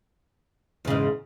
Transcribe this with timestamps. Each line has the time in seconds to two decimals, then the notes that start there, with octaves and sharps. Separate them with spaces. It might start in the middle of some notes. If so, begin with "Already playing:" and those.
0.85 E2
0.87 C#3
0.90 G#2